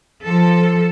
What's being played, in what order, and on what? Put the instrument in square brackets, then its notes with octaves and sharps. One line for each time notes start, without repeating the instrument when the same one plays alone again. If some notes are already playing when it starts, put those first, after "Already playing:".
[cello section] F3 A4